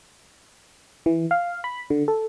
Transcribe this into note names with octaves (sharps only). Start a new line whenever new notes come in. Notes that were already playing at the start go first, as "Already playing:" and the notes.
E3
F5
B5
D3
A4